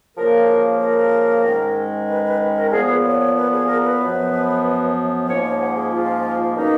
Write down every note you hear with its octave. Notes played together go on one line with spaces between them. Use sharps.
C#3 F3 A#3 A#4
A#4
G#2 D#3 G#3 C#4
B4
B4
A#4
A#2 F3 B3 G#4
B4
C#5
C#5
B4
G#4
A#4
B4
F#2 F3 B3
G#2 F3 A#3 C#4 C#5
C#5
F#5
G#4
F4
B2 A#3 C#4 D#4